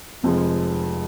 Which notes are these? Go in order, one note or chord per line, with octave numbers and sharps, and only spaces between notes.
F1 F2 F3 G#3